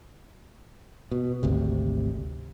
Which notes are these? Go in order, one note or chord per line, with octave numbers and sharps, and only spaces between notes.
B2
G#1 D2 C3